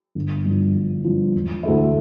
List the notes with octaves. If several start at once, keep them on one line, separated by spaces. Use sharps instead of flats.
G1
G2 F3
G1
G2 F3
E1
D2 D3 A3 E4